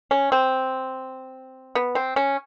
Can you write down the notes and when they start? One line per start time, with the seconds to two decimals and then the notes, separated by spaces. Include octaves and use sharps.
0.11 C#4
0.32 C4
1.75 B3
1.95 C4
2.16 C#4